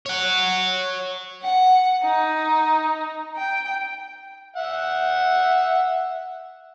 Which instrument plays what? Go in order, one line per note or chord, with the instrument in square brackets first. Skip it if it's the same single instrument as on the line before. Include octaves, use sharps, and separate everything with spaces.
[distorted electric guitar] C#5 F#5
[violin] F#5
D#4
G5
[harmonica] E5 F#5